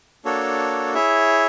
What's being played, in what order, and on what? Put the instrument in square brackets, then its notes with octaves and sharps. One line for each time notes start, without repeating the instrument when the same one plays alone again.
[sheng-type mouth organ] A#3 D4 F#4 A4 C#5
E4 G#4 C#5 E5